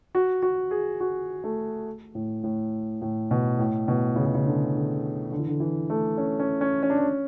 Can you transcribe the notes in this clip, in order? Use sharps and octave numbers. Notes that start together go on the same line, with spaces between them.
F#4
F#4
G#4
F#4
A3
A2
A2
A2
B2
A2
B2
C#3
B2
C#3
D3
D3
D3
E3
D3
E3
A3
C#4
C#4
C#4
C#4
D4
C#4